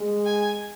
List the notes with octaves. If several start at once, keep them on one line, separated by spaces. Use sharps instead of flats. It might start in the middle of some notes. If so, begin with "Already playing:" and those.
Already playing: G#3
G#5